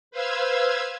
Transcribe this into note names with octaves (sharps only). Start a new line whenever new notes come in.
B4 C5 F5 E6 G#6